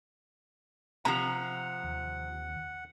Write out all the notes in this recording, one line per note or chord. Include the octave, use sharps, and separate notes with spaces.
C3 F3 F#5 A#5
D#2